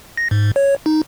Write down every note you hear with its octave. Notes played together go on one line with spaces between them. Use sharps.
A#6
G#2
C#5
D#4